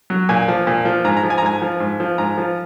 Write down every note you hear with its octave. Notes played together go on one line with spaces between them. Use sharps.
F#3
A#2 G#5
F3
A#2
F3
G#2 A#5
A#5
F3
G#5
A#5
G#2 G#5
F3
G#2
F3
G#2 A#5
F3